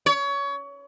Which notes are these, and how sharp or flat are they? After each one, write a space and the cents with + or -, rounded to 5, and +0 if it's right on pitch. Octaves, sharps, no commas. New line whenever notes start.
C#5 +25